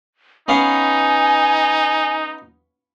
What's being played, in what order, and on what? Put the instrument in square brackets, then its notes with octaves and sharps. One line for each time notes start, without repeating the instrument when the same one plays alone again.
[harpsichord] B3 C#4 F5 [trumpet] D#4 [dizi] G#5